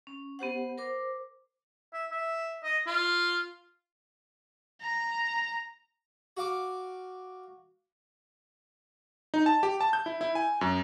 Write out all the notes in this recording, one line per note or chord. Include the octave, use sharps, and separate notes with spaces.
C#4
B3 G4 C5 F#5
A#4 C5 D6
E5
E5
D#5
F4
A#5
F#4 F5 D6
D#4
A5
G4
A5
G6
E4
E4
G#5
F#2